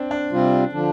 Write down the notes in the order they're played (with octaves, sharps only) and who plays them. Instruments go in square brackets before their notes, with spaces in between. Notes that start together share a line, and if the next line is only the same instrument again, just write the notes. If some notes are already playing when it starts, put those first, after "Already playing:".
Already playing: [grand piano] C4 D4
D4
[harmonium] C3 G3 C4 F4
D3 F3 D4